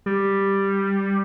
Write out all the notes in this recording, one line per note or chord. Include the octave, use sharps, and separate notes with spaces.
G3